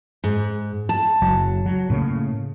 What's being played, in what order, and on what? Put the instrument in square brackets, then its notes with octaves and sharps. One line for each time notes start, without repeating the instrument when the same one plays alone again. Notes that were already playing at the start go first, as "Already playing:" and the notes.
[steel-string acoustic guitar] G#2
A5
[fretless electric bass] F#1 F#3
F#3
A2 C#3 A#3